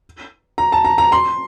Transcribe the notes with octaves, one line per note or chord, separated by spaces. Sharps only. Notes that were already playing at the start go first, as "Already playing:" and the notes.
A#5
A5
A#5
A#5
C6